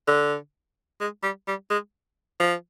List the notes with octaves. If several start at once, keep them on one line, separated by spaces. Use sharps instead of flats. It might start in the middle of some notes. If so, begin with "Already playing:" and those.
D3
G#3
G3
G3
G#3
F3